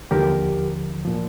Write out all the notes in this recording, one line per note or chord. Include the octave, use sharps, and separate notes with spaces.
D#2 D3 F3 G4 A#4
A#2 F3